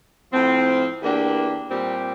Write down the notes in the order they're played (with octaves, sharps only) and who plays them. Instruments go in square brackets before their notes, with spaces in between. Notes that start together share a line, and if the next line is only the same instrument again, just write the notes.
[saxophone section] A2 F3 C4
E2 E3 A#3 D4 G4
A#2 G3 C4 G4